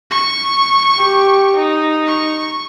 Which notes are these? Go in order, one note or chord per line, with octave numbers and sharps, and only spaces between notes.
C#6
G4
D#4
C#6